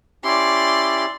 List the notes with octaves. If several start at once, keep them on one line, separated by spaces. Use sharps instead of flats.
C#4 E4 G4 D5 C6